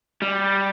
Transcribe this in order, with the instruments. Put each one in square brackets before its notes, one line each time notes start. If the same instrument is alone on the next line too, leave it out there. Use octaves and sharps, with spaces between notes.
[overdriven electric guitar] G3